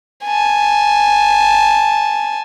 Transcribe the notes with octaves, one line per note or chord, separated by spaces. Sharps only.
G#5 A5